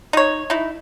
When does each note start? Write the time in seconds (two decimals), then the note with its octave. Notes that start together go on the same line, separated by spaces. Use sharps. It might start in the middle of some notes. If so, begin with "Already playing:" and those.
0.13 D#4 C#5
0.50 D#4 E4